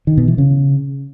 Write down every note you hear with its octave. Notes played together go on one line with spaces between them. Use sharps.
D#3
B2
E3
C#3